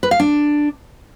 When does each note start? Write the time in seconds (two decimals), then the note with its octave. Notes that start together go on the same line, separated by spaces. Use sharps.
0.03 B4
0.11 F5
0.20 D4